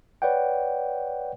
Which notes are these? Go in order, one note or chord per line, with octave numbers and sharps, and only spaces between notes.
B4 C#5 D5 F#5 G5